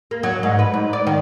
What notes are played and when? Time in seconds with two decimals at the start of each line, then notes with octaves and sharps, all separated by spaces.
0.11 A#3
0.23 F#3
0.43 G#2
0.59 B4
0.74 G#2
0.93 D5
1.07 D#3